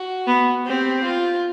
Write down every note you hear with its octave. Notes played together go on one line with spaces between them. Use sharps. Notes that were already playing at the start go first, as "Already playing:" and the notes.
Already playing: F#4
B3
C4 G4
F4